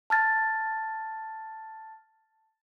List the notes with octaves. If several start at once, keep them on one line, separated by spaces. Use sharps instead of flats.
A5 F6 A6